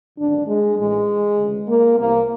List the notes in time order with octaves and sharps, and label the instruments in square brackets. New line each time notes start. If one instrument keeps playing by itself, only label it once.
[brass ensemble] G#1 F#2 D3 D4
G#3
A1 A2 E3 G#3
D2 C#3 E3
A#3
C2 C3 E3 A#3